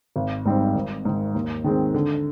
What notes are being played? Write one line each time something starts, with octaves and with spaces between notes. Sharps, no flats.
G#1
G#2 G3 C4 D#4
G#1
G#2 D#3
D#2
D#3 G#3 C4
D3